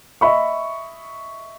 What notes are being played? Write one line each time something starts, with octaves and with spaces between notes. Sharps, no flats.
D#5 E5 B5 C#6